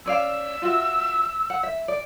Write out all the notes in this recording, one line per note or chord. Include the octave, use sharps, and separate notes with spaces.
C#4 D5 F5 E6
F4 F#4 E5
F#5
E5
D5